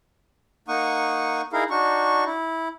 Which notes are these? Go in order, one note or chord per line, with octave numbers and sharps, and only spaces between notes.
A#3 D#4 F#5 C#6 D#6
D#4 E4 G#4 A#4 F5
D4 D#4 F#4 C#6
E4